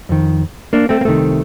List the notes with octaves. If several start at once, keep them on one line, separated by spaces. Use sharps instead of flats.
F2 D#3
A#3 D4
A3 C4
A#3
C2 C3 D#3 A3